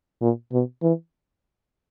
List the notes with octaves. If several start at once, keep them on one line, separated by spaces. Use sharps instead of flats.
A#2
B2
E3